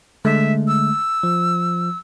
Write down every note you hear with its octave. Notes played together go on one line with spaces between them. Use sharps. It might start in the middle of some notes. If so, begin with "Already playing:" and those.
D3 G#3 A3 E5
E6
F3